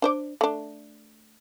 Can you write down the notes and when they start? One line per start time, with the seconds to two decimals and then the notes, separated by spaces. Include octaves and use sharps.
0.02 D4 C5 D5
0.41 A3 D4